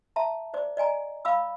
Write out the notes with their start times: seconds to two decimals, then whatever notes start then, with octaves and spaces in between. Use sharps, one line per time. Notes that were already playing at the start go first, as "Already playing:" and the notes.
0.16 E5 A5 A#5
0.54 C5 D5 D6
0.77 D5 D#5 G#5 A#5
1.25 F5 B5 D6 E6